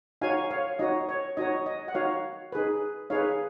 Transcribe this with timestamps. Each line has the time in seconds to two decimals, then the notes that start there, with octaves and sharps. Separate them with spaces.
0.21 D#4 F#4 C#5 F5 G#5
0.51 C#5 F5
0.79 D#4 F#4 C#5 D#5
1.09 C#5
1.37 D#4 F#4 C#5 D#5
1.66 D#5
1.88 F#5
1.94 D#4 F#4 C#5 F5
2.52 D#4 G#4 B4
3.10 D#4 G#4 B4 C#5 F5